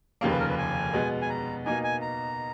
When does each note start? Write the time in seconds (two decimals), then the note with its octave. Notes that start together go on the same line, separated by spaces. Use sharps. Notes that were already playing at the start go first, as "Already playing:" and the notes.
0.21 F1 D#2 C#3 F3 A#3
0.30 B4
0.39 A#4
0.49 B4
0.58 G#5
0.93 B2 G#3 B3
1.22 G#5
1.29 A#5
1.66 B2 A#3 D#4 G#5
1.84 G#5
2.02 A#5